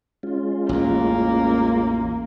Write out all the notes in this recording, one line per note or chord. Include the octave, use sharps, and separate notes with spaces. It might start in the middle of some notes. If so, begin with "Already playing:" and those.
G#3 C#4 F4
A1 E2 A#3